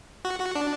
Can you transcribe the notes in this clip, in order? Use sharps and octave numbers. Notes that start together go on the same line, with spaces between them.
F#4
F#4
D4